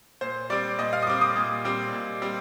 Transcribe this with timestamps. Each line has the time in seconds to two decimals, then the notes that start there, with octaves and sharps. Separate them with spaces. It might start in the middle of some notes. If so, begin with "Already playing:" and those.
0.21 A#2 C5
0.50 G3 C4 D5
0.79 A#2 D#5
0.93 F5
1.03 D#6
1.07 G3 C4 D6
1.21 D#6
1.36 A#2
1.65 G3 C4
1.93 A#2
2.22 G3 C4